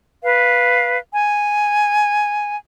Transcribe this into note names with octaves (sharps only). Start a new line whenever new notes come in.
B4 F5
G#5